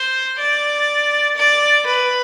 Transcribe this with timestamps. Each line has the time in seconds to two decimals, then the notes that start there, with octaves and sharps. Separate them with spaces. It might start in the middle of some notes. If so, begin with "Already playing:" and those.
Already playing: C5
0.39 D5
1.37 D5
1.87 B4